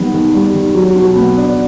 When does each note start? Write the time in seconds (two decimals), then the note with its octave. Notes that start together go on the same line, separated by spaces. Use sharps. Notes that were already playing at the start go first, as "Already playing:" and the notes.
Already playing: D#3 G3 B3
0.14 D#3
0.34 G3
0.54 D#3
0.74 F#3
0.96 B2
1.16 B3
1.37 D4